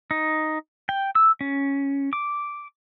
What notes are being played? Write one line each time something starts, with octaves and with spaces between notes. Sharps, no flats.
D#4
G5
E6
C#4
D6